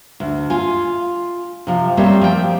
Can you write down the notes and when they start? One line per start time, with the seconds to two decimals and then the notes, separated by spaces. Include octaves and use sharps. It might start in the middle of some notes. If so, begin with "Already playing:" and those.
0.20 D2
0.50 F4 G#5
1.67 C3 F3
1.97 G3 A3 A#3 C4 C#5
2.21 F3 G5